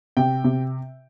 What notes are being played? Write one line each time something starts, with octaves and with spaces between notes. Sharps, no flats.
C3 G5
C3